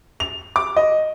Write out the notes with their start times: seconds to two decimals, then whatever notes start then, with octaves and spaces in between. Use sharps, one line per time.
0.20 F7
0.56 D6
0.77 D#5